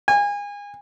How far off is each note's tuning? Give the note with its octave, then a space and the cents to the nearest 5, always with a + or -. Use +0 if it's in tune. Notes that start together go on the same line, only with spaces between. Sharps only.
G#5 -30